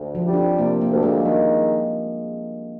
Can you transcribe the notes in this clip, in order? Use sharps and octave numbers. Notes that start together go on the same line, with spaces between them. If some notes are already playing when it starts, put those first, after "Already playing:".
Already playing: D2
F3
G3
D4
C4
C3 A#3
A#3
D2
G#3
D#3 G3